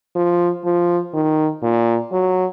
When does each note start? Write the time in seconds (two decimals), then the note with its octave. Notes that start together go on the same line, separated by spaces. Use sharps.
0.16 F3
0.65 F3
1.14 D#3
1.63 A#2
2.12 F#3